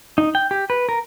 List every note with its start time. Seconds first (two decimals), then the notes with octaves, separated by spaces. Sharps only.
0.18 D#4
0.35 G5
0.51 G4
0.70 B4
0.89 A#4